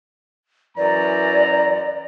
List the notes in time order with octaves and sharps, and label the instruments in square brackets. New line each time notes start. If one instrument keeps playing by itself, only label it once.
[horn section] F#2 E3 A#5 [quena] D5